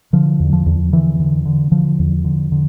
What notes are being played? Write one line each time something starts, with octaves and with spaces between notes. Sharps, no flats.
D3 F3
E2
F3
E2
D3 E3
D3
D3
D3 F3
E2
D3
D3